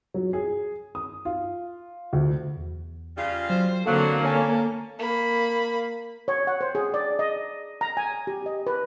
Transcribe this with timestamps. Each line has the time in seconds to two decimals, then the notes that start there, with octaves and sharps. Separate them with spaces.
0.14 F#3
0.33 G#4
0.95 D#6
1.25 F4
2.13 D2
2.57 E2
3.17 C#3 G3 F4
3.50 F#3 C5
3.86 D3 F#3 A#3 C4 D4 A4 F5 F#6
4.24 C#4 A4 C#5 G#5
4.99 A#3 B5
6.28 C#5
6.47 F#5
6.61 C5
6.75 G#4
6.94 D5
7.19 D#5
7.81 A#5
7.97 G#5
8.27 G4
8.46 D#5
8.67 B4